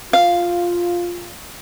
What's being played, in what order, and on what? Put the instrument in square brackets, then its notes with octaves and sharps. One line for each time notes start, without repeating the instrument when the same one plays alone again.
[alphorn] F4 [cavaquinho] F5